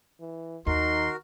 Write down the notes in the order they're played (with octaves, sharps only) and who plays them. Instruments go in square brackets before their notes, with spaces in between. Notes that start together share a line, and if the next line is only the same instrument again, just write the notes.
[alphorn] E3
[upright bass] D#2 [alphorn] D#4 [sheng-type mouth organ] F#4 A#4 [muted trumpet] C6